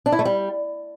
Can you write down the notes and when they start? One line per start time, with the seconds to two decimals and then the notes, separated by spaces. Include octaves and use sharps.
0.06 D4
0.12 E4
0.19 A3
0.25 G3